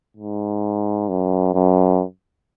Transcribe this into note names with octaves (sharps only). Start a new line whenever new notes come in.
G#2
F#2
F#2